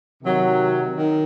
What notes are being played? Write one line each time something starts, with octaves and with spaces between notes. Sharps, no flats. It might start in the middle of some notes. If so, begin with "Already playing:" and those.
C3 D#3 F#3
D#3